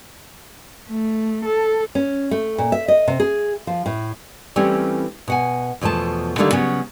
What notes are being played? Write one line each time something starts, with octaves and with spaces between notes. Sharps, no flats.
A3
A4
C#4
A3
A#2
E5
D#5
C3
G#4
F3
A2
E3 G3 A3 C4 C#4
B2 F#5 G#5
E2 B2 F3 A3 A5
D3 D#3 G3 A3 A#3 A4
C#3 F#3 B3 C#4